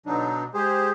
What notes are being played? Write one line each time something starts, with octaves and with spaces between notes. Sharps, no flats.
B2 D3 F#3 D4 D#4
G#3 G4 G#4 C5